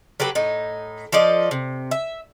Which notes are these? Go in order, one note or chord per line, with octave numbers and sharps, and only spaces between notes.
F#3 G4 A4 B4
A2 D#4
F3 A4 D5 D#5
C3
E5